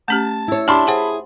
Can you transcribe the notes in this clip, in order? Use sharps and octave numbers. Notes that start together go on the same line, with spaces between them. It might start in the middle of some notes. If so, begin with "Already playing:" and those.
A3 C#4 G4 A5
E4 C#5
D4 G4 A5 B5 C6
G#4 C5 F#5 G#5